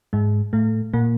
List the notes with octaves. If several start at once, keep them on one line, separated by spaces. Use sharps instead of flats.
G#2 G#3
A2 A3
A#2 A#3